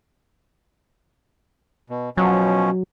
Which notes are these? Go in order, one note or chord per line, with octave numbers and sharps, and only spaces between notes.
B2
B2 F3 F#3 C#4